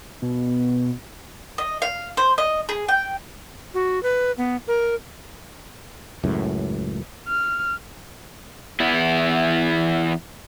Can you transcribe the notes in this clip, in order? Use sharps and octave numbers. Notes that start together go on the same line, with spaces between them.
B2
D#5
F5
C5
D#5
G#4
G5
F#4
B4
B3
A#4
C#2 F#2 A2
F6
E2 B3 E4